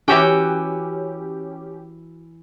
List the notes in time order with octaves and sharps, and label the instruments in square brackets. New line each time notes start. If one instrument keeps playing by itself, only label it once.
[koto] E3 F#4 G5 [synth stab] C#4 G4